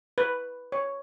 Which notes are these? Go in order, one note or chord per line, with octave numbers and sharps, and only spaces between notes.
B4
C#5